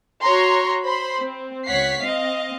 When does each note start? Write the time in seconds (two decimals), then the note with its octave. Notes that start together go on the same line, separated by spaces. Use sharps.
0.23 F#4 C#5 A#5 C6
0.83 C5 B5 C6
1.20 C4
1.66 C#2 C#5 F#5 B6 C7
2.03 C4 D#5 F5